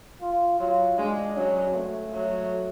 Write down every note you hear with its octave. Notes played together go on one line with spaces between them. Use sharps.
F4
F#3 F4
G#3 D4
F#3 C#4
A3
F#3